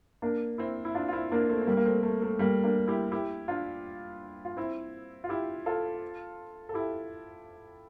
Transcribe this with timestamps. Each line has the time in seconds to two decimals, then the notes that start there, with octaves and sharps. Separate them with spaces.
0.22 A#3 D4
0.58 C4 E4
0.85 E4
0.95 D4 F4
1.08 F4
1.13 C4 E4
1.32 A#3 D4
1.49 A3 C4
1.61 C4
1.67 G3 A#3
1.77 A#3
1.85 A3 C4
2.03 A3
2.22 A3
2.39 G3 A#3
2.64 A#3 D4
2.88 E4 G4
3.12 E4 G4
3.48 D4 F4
4.45 F4
4.57 C4 E4
5.24 F4
5.29 E4 G4
5.66 F4 A4
6.69 A4
6.74 E4 G4